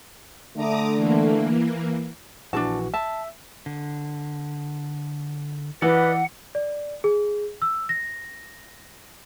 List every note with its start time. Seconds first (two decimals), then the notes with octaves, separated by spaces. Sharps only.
0.57 D3 A3 A#5 D6 D#6
0.95 E3 A#3
2.53 A#1 E3 D4 F#4 A#4 A5
2.94 E5 A5
3.66 D3
5.82 E3 B4 D5 D#5 F#5
6.55 D5
7.04 G#4
7.62 E6
7.89 A#6